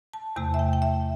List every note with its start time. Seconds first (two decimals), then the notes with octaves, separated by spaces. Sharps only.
0.13 A5
0.36 E2 C3 A3 A5
0.54 E5
0.59 G5
0.73 G5
0.82 E5